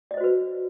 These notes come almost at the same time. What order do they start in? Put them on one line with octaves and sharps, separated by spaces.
D5 D#5 C5 F#4 B4